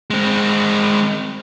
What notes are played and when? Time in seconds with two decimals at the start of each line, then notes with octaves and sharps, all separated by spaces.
0.10 G#3 C4